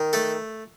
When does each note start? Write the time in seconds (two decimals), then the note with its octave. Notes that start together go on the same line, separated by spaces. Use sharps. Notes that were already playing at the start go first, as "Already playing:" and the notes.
Already playing: D#3
0.13 A3 A4